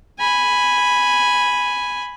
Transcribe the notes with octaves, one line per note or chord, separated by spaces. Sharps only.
G#5 B5